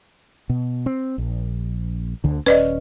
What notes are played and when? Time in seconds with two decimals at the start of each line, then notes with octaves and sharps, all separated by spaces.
0.50 B2
0.86 C4
1.18 A#1
2.24 D2 D3
2.46 D#1 C#4 B4 D5 D#5